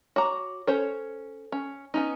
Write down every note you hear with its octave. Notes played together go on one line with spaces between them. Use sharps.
F#4 C#5 A#5 D6
C#4 A4 C5 C#5
C#4
B3 C#4 D#4